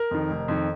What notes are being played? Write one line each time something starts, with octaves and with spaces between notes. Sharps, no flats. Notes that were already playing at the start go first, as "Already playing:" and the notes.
Already playing: A#4
F2 D#3
F1
F2 D#3